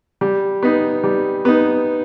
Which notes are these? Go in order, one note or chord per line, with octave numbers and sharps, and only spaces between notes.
G3
B3 D#4
G3
B3 D#4